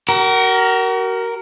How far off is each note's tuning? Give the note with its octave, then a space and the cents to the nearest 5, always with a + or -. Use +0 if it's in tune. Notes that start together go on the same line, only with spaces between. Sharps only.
F#4 +40 A#4 +0